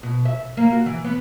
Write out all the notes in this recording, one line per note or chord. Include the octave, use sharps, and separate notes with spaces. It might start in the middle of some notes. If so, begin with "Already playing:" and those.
B2
E5
A#3
F#4
E3
B3